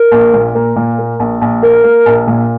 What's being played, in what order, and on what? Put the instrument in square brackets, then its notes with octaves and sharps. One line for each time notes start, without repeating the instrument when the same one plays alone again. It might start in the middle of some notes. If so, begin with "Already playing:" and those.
Already playing: [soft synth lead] A#4
[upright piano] A#1
A#2
A#3
A#2
A#3
A#1
A#1
[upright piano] A#3 [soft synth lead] A#4
[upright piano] A#3
A#1
A#2